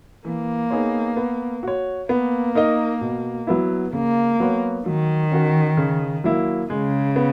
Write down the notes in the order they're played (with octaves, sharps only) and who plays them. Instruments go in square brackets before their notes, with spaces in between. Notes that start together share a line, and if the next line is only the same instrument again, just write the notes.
[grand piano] E3 [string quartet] A#3
[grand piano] B3 D#4 G#4 C#5
B3
F#4 C#5
[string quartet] A#3 [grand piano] B3
[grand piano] D#4 A#4 D#5
B2
F#3 B3 E4
[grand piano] C#3 [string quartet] A#3
[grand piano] F#3 B3 F#4 C#5
[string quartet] D#3 [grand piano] F#3
[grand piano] C#4 F#4 A#4
C#3
F#3 A#3 E4
[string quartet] C#3 [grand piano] G#3
[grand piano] B3